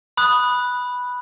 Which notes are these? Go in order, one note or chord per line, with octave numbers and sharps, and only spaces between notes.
B5 D#6 F#6